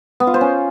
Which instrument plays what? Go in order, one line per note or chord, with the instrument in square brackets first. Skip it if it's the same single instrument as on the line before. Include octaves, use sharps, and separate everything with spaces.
[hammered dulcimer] B3
F4
C5
C#4